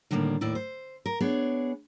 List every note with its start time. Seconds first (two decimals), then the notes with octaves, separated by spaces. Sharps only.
0.11 A2 D3 D#3 G3 A3 A#3
0.41 D#2 A2 E4 D5
0.55 C5
1.06 A#4
1.20 B3 D4 G#4 C#5